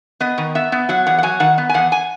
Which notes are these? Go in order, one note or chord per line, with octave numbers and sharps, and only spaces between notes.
B3 D#5
D#3
B3 E5
B3
F#3 F#5
E2 F#5
F#5
F#3 G#5
D#3 F#5
B3
G#5
E2 F#5
G#5